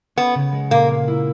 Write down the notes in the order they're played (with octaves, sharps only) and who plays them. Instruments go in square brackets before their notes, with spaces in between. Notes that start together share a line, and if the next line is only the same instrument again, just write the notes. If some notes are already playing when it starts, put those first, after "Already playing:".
[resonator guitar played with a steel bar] B3 [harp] C#4
[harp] C#3
G#3
[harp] A#2 [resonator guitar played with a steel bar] A#3
[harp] A#3
E4